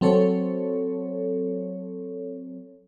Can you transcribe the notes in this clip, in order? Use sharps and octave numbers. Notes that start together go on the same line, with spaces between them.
F#3 C4 A4 C#5